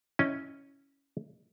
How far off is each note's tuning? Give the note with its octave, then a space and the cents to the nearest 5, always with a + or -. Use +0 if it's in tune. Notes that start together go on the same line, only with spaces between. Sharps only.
C#4 +0 E4 -15 D#5 -10